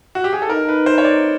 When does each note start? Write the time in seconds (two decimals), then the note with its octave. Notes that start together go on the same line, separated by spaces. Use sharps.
0.15 F#4
0.24 G4
0.33 G#4
0.42 A4
0.49 D#4 A#4
0.69 B4
0.86 C5
0.98 C#5
1.04 D5